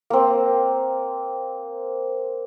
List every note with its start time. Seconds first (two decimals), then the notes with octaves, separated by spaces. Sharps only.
0.10 A#3 C4